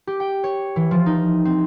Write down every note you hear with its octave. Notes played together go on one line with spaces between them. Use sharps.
G4
G5
C#5
E3
F3
D#4
C4